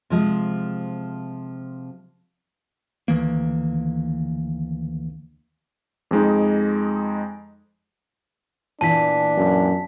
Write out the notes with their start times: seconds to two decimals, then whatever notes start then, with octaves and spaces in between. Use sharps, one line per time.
0.10 C3 F3 G#3
3.08 D2 D#3 E3 A#3
6.11 F2 G#3 D#4
8.81 A#2 E3 D4 A5 B6
9.37 F#2